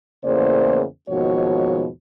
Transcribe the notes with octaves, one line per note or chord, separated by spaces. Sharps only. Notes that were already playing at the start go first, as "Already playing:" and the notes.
E2 A2 C#3 A#3 C5 D5
D#2 G#2 B2 F3 F#4 C#5